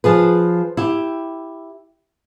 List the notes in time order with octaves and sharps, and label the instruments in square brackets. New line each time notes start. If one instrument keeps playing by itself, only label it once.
[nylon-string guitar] F3 G#4 B4
E4 G4